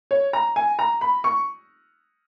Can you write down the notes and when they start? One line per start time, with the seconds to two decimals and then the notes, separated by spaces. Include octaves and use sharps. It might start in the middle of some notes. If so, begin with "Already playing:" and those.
0.11 C#5
0.33 A#5
0.56 G#5
0.79 A#5
1.01 B5
1.24 C#6